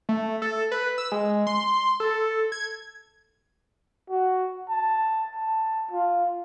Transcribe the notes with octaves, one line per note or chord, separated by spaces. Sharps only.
A3
A4
B4
E6
G#3
C6
A4
G#6
F#4
A5
A5
F4